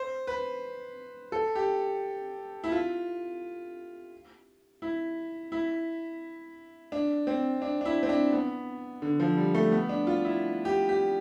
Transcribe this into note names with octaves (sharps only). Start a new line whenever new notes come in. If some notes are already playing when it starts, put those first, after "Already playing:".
Already playing: C5
B4
A4
G4
E4
F4
E4
E4
D4
C4
D4
D4
E4
C4
D4
B3
D3
F3
G3
A3
B3
D4
F4
E4
G4
G4